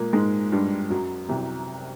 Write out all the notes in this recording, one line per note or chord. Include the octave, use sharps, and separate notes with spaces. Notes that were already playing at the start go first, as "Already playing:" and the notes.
Already playing: A#2 G#3 A#3
G#2 G#3
G2 G3
F#2 F#3
C2 C3